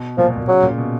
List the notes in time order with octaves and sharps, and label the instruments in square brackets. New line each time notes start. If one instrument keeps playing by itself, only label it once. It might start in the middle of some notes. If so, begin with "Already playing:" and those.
Already playing: [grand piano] B2
[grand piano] A#2 [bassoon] F3
[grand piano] B2
A#2
[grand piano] C#3 [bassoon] F#3
[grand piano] A#2
B2